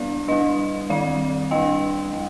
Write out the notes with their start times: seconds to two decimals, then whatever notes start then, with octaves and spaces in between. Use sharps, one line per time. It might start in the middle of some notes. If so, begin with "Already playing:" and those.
Already playing: G3 B3 D4 D5 F5
0.28 G3 D4 D#5
0.90 D#3 G3 C4 D5 F5
1.51 G3 D4 D#5 G5
2.13 G3